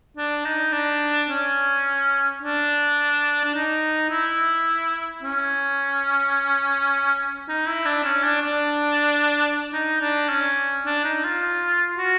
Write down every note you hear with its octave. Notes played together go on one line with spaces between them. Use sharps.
D4
D#4
D4
C#4
D4
D4
D#4
E4
C#4
D#4
E4
D4
C#4
D4
D4
D#4
D4
C#4
D4
D#4
F4
F#4